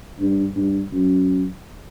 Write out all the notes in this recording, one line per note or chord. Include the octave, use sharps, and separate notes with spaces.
G2
G2
F#2